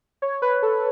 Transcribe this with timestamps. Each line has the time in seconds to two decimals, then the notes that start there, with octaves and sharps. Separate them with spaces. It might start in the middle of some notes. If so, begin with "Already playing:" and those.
0.22 C#5
0.42 B4
0.62 A4